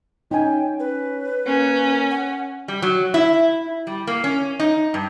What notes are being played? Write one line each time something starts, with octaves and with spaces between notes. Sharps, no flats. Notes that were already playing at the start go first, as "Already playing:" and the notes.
C#4 D#4 G5 G#5
C#4 B4
A#3 C#4
F#5
G3
F#3
E4
G3
A#3
C#4
D#4
G2